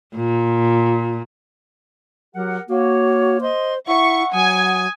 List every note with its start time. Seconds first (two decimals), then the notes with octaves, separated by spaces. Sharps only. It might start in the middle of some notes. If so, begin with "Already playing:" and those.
0.15 A#2
2.35 F#3 G4 A#4 F#5
2.69 A#3 F#4 C#5
3.41 C5 D#5 C6
3.87 E4 E5 F#5 C#6
4.33 F#3 G#5 D#6